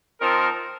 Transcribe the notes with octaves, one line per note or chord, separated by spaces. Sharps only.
F3 C4 D#4 A#4